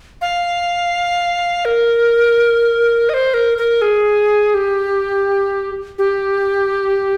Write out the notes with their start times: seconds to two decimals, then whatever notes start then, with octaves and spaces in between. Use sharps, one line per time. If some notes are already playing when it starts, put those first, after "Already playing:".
0.21 F5
1.65 A#4
3.09 D#5
3.14 C5
3.34 A#4
3.58 A#4
3.82 G#4
4.54 G4
5.98 G4